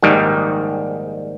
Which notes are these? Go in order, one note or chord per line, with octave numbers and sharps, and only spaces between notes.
A#1 G#2 D#3 G3